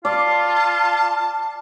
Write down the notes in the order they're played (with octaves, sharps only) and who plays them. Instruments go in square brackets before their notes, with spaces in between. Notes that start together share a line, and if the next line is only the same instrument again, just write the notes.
[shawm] F4 [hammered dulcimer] D5 [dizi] A5